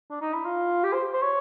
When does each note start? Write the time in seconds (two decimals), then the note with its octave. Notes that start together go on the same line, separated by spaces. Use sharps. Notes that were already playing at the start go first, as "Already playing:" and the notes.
0.10 D4
0.21 D#4
0.34 E4
0.45 F4
0.83 G4
0.93 C5
1.13 C5
1.22 C#5